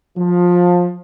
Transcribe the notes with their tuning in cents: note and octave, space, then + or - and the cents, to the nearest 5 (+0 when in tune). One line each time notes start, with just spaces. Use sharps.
F3 +20